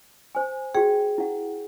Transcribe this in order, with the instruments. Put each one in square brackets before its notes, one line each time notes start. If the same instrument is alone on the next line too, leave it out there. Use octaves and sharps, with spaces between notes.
[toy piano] C5 G#5
[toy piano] F#4 G5 [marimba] G#4
[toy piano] E4 F#5